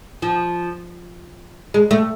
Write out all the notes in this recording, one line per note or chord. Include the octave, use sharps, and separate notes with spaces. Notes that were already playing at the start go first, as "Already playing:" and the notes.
F3
G#3
A3